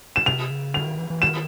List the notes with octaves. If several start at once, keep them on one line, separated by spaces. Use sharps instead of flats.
E7
C3 F7
C#3
D3 F7
D#3
E3
E3
D#3 E7